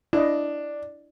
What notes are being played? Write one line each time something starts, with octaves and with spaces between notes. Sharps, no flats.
D4 E4 D#5